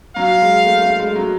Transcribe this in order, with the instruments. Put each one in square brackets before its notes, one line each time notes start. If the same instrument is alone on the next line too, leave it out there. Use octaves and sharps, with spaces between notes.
[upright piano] F#3 [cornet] F5
[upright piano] G#3
A3
A3
G#3
F#3